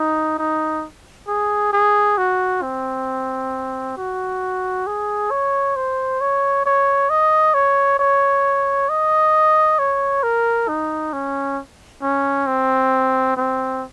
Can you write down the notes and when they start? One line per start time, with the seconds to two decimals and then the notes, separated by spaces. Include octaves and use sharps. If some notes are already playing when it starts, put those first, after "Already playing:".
Already playing: D#4
0.38 D#4
1.28 G#4
1.73 G#4
2.18 F#4
2.62 C4
3.97 F#4
4.87 G#4
5.31 C#5
5.76 C5
6.21 C#5
6.66 C#5
7.10 D#5
7.54 C#5
7.99 C#5
8.90 D#5
9.79 C#5
10.23 A#4
10.68 D#4
11.13 C#4
12.03 C#4
12.47 C4
13.37 C4